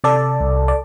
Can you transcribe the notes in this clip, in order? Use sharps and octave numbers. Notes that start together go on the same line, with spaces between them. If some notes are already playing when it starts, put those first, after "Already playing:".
C3 A4 D5
C2
D5